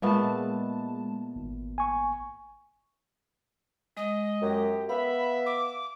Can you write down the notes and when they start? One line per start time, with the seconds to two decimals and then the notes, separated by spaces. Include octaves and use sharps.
0.02 A#2 G#3 A3 B3 A5
1.35 G#1
1.78 G#5 C#6
3.97 G#3 D#5
4.42 F#2 G4
4.89 B3 E5 F5 B5
5.46 D6